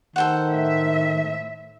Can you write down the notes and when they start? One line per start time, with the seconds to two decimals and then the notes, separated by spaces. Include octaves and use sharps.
0.16 D#3 A4 C5 F#5
0.49 A2 E5